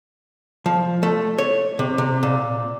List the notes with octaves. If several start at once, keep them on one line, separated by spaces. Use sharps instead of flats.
F3
A3
C#5
C3
C3
A#2